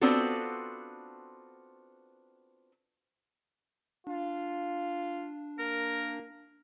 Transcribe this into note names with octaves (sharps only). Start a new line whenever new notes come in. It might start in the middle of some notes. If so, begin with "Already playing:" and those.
B3 C4 D4 F4 F#4 A4
D4 F4
A#3 A#4